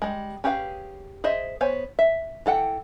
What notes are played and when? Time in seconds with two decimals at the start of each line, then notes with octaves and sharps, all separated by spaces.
0.02 G3 G#3
0.44 C#4 G4 G#4 B4 F5
1.24 G#4 C5 D#5 E5
1.61 B3 C5 C#5 G#5
1.99 E5
2.46 E3 A4 F#5 G5